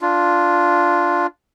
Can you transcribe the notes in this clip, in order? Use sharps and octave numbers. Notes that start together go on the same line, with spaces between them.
D4 F4